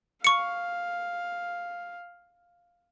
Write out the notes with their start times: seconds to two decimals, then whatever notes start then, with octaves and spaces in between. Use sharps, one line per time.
0.24 F5 C#6 C#7